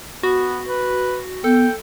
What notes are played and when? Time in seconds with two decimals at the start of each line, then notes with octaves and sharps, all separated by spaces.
0.23 B3 F#4
0.68 B4
1.44 B3 A4 G5